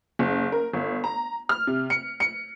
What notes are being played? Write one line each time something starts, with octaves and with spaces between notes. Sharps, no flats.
F#1
A#4
G1
A#5
F6
C3
C#7
C#7